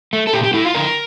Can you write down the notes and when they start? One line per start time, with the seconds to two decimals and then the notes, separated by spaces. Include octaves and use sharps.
0.13 A3
0.27 A4
0.33 A#2 G4
0.43 G4
0.54 A3 E4
0.64 F4
0.74 D3 A#4